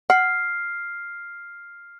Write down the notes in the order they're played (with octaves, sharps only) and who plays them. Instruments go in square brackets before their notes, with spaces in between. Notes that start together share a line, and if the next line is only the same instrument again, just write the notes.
[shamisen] F#5 [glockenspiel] F6 C7